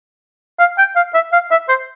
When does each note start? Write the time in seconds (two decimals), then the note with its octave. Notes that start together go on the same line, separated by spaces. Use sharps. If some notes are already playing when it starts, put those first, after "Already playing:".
0.59 F5
0.78 G5
0.96 F5
1.14 E5
1.33 F5
1.51 E5
1.69 C5